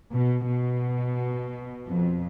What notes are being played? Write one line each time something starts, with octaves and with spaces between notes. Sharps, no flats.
B2
B2
F2